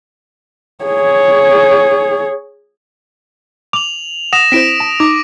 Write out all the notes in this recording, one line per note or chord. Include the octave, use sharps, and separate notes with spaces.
G#4 C#5
D6 F7 F#7
F#5 D#6 A#6 E7
C4 E4 C5 B6 D7
A5
D#4 D6